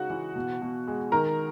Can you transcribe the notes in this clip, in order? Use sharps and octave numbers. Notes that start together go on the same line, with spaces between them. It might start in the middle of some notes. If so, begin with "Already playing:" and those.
Already playing: C#3 G#3 D#4 F#4 F#5
E3
B2
B2
G#3
D#3 A#4 A#5